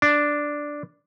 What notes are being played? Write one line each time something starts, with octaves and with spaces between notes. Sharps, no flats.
D4